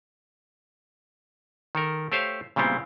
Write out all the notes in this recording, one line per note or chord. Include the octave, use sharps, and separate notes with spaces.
D#3 A4 A#4
A3 G4 C5 C#5 F5
A#2 C#3 G3 B3 C4 E4